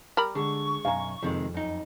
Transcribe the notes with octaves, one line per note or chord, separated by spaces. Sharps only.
G3 A#4 B5
D3 G#3 C#6
B1 F#2 F5 G#5 A#5
F2 C3 D#3 G#3
F#2 D#4